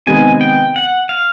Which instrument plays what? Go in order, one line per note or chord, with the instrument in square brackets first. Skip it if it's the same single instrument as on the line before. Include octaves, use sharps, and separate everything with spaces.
[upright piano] C3 D#3 G#3 B3 [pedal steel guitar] G#5
[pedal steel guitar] G5
F#5
F5